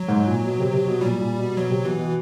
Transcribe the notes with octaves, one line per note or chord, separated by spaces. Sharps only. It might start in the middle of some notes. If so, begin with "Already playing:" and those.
Already playing: F#3
G#2
A#2
B2
C3
C3
B2
A#2 G3
A#2
B2
B2 F#3
C3
B2 E3
B2